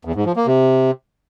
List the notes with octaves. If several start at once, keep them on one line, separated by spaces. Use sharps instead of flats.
E2
G#2
F3
A#3
C3